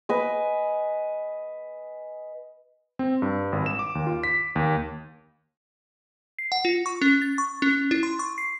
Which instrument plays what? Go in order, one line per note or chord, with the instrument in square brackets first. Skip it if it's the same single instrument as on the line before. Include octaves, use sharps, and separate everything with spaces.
[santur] B4 D#5 G#5
[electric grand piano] C4
G2
G#1
E7
D6
D#2
F4
B6
D#2
[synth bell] C7
F#5
F4
C#6
C#4
A6
C#6
C#4
E4
C6
C#6
C7